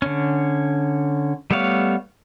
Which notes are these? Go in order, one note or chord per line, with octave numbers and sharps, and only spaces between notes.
D3 C#4
G3 A3 B3 C#5 F5